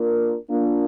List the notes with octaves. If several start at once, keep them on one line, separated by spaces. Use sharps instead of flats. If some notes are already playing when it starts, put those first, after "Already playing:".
Already playing: A#3 D4 F4 A#4
A#3 D4 F4